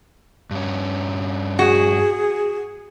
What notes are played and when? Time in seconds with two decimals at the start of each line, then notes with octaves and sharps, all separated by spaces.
0.51 G2 C#4
1.59 F#4 G#4